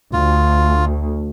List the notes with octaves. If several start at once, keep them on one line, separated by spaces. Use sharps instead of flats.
D2 F4